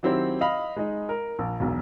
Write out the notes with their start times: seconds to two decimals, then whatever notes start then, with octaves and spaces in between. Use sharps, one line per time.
0.03 D#3 F#3 C4 E4 G4 C5
0.41 D#5 F5 B5
0.76 G#3 D#4
1.09 A#4
1.39 A#1
1.60 E1 B1